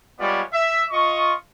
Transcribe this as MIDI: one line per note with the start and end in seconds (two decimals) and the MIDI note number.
0.19 0.42 55
0.19 0.42 56
0.19 0.42 59
0.19 0.42 65
0.19 0.42 73
0.19 0.42 74
0.52 0.82 76
0.91 1.32 65
0.91 1.32 75
0.91 1.32 85